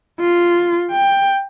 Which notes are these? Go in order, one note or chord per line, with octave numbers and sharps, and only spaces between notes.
F4
G5